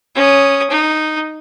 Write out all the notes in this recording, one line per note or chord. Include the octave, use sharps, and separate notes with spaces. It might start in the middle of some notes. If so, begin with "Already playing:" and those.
C#4 D#6
D#4